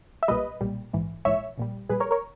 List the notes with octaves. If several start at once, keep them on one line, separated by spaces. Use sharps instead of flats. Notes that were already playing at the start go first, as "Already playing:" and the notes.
E5
B1 A#2 G3 B4 D#5
B1 A#2 G3
A#1 G#2 E3
A#1 G#2 E3 C#5 E5
A#1 A#2 G3
A#1 A#2 G3 G#4 B4
A#4 C#5
A#4 C#5